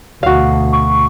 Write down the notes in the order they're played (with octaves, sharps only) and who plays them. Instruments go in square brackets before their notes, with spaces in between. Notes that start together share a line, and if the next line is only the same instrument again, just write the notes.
[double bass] D2 B2 [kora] F#4 F5
[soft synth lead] C#6